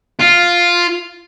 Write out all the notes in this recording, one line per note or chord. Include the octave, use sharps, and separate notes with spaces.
F4